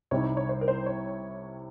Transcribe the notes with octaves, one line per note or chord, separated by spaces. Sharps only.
C2 C3 G3 C4 D#4 C#5
C#5
C5
A#4
C5
C#5